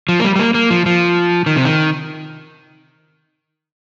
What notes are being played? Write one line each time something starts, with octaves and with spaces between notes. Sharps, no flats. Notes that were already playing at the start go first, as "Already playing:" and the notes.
F3
A#3
G3
G3
A#3
A#3
F3
F3
D#3
C3
D#3